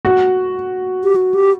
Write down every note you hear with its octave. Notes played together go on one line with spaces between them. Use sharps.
F#4
G4
F#4
G4